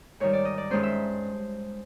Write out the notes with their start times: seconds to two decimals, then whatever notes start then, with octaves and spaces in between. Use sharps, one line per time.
0.20 G#2 D#3 G3 C#5
0.33 D5
0.45 D#5
0.58 D5
0.70 G2 D#3 G#3 C#4 C5
0.83 E5